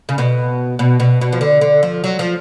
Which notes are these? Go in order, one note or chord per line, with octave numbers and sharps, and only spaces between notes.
C#3
B2
B2
B2
B2
F3
D3
D3
F3
F#3
F3